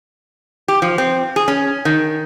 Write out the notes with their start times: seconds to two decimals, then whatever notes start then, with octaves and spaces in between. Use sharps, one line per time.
0.68 G4
0.82 F3
0.98 C4
1.36 G#4
1.48 C#4
1.85 D#3